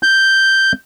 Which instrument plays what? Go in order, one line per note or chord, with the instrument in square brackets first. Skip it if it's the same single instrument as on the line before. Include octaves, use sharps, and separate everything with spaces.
[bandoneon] G6